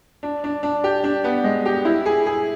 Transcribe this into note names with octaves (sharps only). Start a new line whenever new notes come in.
D4
D4
D4
G4
D4
B3
G#3
G4
E4
G#4
G#4